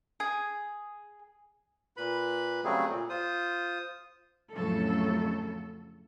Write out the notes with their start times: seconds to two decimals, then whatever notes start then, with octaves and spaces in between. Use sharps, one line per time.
0.20 G#4
1.97 A#2 B4 B5
2.64 C#3 F#3 G3 A3 C4 G#4
2.89 A#2
3.09 F4 C5 D#6
4.53 F2 A2 C#3 F3 F#3 A4